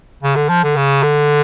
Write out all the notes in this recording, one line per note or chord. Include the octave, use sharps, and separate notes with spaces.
C#3
D3
F3
D3
C#3
D3